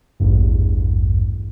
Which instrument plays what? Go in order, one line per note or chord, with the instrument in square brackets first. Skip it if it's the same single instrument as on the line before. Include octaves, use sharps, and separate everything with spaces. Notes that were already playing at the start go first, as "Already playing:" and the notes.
[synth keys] A1 E2 G2